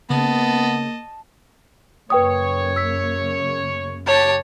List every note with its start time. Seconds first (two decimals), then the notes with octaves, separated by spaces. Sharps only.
0.10 C#3 A#3 B3 D#5 A5
2.10 F#2 C#3 A#3 B4 C#5 G5 D#6
2.76 E6 B6
4.07 G4 C#5 A5